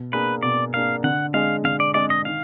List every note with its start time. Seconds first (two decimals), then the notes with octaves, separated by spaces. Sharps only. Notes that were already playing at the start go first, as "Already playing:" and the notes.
Already playing: B2
0.12 A#3 D4 G#4 B4
0.43 B2 D5
0.74 A#3 D4 G#4 F5
1.04 D3 F#5
1.34 G#3 D4 G#4 D#5 F5
1.64 D3 F5
1.80 D5
1.94 G#3 D4 G#4 D5 D#5
2.10 D#5
2.25 D#3 F5